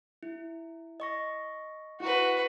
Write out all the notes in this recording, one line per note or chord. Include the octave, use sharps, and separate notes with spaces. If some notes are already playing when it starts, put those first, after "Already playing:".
E4
D#5 C#6 A#6
E4 F#4 B4